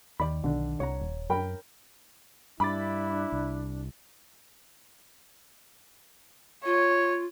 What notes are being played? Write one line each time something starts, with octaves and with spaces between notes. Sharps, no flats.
D#2 D#3 D5 B5
B1 D3 D4
C2 C#5 F#5 A#5
D#1
F#2 A#4 G5 B5
G2 D4 E4 B5 D6 A6
C2
F4 C#5